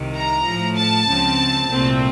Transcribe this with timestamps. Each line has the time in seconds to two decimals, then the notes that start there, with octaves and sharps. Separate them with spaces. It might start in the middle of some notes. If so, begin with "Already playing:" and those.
Already playing: C2 C3 D#3
0.16 A#5
0.47 A2 F3 A3
0.77 A5
1.07 C#2 C#3 F3 C4
1.68 C2 A#2 A3 C4